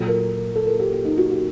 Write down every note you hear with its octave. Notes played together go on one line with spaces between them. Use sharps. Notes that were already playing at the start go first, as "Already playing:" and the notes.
Already playing: A#2 F#3 A4
A#4
A4
A#4
G4
G4
D#4
F#4
G4